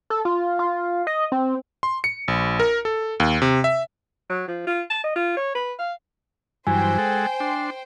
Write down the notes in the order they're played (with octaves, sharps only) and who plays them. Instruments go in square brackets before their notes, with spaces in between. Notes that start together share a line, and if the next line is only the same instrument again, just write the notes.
[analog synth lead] A4
F4
F4
D#5
C4
[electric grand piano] C6
C#7
A#1
A#4
A4
D#2
C3
E5
[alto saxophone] F#3
F3
F4
A5
D#5
F4
C#5
B4
F5
[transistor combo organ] G2 E3 F#3 [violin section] C5 G5 [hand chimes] G#5
[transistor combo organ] G#3 A4 F#5
D4 C6